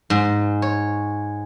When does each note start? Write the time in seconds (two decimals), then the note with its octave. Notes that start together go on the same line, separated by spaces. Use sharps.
0.10 G#2
0.62 C#5